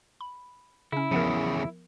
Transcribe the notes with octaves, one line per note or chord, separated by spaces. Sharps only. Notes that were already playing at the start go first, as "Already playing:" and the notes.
B5
C#3 C#4 E4
E2 C#3 F3 B3 A#4